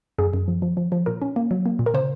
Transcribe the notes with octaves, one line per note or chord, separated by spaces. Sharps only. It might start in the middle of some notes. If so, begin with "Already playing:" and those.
F#2 G#4
F#2
F3
F3
F3
F3
A#2 A#4
C#4
A#3
F#3
A#3
A#2
A#4
C#3 C5